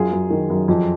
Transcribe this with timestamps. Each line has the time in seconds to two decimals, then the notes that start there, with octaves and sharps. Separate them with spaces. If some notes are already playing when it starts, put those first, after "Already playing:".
Already playing: F#2 F4 G#4
0.12 F#2
0.30 D#3
0.50 F#2
0.68 F2